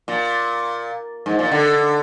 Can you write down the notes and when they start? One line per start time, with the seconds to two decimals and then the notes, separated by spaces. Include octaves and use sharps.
0.08 A#2
1.26 G#2
1.39 A#2
1.52 D3